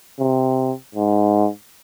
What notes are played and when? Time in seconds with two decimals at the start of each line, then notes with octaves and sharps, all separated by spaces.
0.19 C3
0.95 G#2